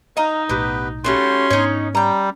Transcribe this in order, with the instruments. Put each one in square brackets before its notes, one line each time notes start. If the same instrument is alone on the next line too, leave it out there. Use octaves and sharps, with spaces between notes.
[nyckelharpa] D#4 [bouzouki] D#5 F5 A#5
[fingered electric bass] B1 A2 [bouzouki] B3 G4 [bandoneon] B4
[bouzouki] G3 A3 F#4 [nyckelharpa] C#4 [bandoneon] C6
[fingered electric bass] G#2 B3 D4 [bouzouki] D#4 C#5
[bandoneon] G3 [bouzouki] G5 A#5